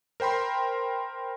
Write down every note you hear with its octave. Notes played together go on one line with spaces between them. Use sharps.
A#4 C5 G5 B5 C6